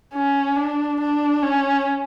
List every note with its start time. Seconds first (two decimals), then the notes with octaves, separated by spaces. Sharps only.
0.14 C#4
0.57 D4
1.00 D4
1.43 C#4